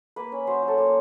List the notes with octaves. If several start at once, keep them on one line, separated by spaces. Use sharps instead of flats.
A#3 B4
C#4
F#3 C5
F#3
A4
A#3